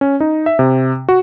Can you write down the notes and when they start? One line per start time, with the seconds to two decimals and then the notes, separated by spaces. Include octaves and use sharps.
0.01 C#4
0.20 D#4
0.46 E5
0.59 C3
1.09 F#4